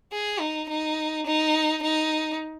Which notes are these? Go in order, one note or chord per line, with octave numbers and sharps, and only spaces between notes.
G#4
D#4
D#4
D#4
D#4